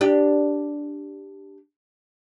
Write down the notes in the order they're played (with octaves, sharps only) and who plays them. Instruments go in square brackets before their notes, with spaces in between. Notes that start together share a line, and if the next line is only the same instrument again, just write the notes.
[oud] D4 G4